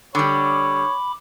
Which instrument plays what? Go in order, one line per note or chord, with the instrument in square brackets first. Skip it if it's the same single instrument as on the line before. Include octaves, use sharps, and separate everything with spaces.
[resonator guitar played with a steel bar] D3 G3 [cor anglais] C#5 [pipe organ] B5 D6